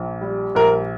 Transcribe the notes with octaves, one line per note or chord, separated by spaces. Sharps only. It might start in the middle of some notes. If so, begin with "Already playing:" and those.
Already playing: A#1
G3
A#1 A#4